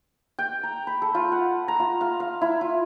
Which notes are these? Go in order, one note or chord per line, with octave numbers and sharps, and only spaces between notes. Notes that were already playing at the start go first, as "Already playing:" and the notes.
G5
A#5
B5
A4
F4
F#5
A#5
F4
F5
F5
E4
F4